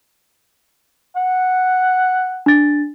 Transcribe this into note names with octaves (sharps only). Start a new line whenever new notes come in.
F#5
D4 A6